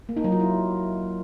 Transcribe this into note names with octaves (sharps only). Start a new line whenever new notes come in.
A#3
D#4
F#3
F4
E4